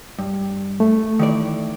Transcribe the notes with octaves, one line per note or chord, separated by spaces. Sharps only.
G2
A3
D#3 E3 D5